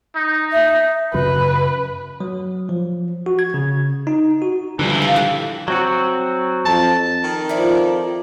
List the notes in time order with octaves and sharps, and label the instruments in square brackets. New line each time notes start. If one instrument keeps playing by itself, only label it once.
[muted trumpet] D#4
[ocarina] E5
[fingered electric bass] F#2 C#3 F#3 [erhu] B4
[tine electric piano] F#3
F3
F#4
G#6
C#3
D#4
F#4
[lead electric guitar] C#2 E3 [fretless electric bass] D3 F3 G3
[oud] F4
G4 A4
[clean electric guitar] F#3 C4 F#4
[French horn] F2 [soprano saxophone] A5
[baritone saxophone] D#3
[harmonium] F2 F3 [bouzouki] E4 D5